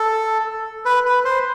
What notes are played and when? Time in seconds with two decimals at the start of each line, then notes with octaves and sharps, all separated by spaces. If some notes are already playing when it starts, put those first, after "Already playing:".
Already playing: A4
0.85 B4
1.06 B4
1.25 C5